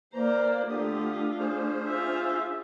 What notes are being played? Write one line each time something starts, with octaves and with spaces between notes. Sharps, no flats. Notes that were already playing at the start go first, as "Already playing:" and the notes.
E3 A#3 C5 D5 A#5
D3 A3 D4 F4 G4 D#6
C#4 G#4 C5
F4 E5